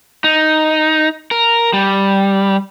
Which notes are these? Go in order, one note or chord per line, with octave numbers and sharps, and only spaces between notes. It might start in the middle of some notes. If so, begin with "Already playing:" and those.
D#4
A#4
G3